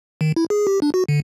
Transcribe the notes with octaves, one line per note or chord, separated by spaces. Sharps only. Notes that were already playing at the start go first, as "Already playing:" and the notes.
D#3
E4
G#4
G4
D4
F#4
D3